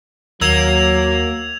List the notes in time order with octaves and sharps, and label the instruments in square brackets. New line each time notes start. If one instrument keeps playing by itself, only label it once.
[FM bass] D#2 [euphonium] F#3 [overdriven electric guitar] A#3 [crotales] E6 G#6 F7